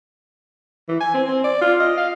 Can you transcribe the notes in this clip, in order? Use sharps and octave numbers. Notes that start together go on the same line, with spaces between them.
E3
G#5
C4
C4
D5
F4
D#5
F5